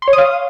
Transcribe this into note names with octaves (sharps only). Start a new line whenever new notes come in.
C6
C#5
D#6
F5